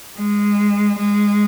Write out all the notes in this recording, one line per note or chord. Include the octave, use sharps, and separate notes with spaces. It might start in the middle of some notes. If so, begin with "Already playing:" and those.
G#3
G#3